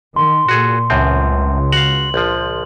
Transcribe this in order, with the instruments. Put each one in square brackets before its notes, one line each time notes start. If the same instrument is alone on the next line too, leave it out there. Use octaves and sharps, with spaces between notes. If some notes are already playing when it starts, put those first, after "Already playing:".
[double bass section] D#3 [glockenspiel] C6
[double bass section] A#2 [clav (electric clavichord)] F#4 G#4 A4
[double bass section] C#2 [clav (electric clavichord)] F#2 A2 C4
[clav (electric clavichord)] F#4 F5 [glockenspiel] F#7
[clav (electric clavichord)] A#1 F3